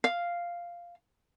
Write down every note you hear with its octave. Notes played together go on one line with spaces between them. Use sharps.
F5